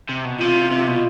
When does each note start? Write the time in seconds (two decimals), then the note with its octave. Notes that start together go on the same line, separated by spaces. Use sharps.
0.09 C3
0.25 B2
0.40 C3 F4
0.71 C3
0.88 B2